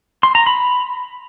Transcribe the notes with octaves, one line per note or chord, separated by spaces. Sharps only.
C6
A#5
B5